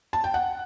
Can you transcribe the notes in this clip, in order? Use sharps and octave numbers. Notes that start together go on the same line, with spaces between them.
A5
G5
F#5